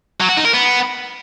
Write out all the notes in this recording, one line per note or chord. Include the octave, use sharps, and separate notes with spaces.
F#3
F#4
D#4
A#4
B3